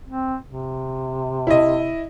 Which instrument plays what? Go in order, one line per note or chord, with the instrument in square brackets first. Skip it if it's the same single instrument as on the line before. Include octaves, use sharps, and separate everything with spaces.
[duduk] C4
C3
[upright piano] E4 D#5